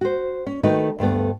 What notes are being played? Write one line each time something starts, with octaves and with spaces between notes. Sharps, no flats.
F#4 C5
C#4
D#3 A3 D#4 F#4 B4
D2 G2 A3 B3